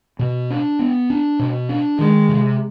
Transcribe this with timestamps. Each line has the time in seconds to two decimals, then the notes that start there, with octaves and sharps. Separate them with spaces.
0.19 B2
0.50 D4
0.79 B3
1.10 D4
1.39 B2
1.69 D4
1.98 D#3 G#3
2.29 C3